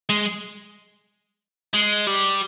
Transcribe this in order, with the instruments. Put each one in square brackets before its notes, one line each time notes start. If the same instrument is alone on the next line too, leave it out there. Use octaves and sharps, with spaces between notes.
[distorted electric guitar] G#3
G#3
G3